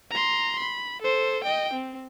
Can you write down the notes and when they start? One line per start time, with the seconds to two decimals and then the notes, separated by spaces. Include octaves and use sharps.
0.11 A#5 C6
0.59 B5
1.02 A4 C5
1.44 D#5 G5
1.74 C4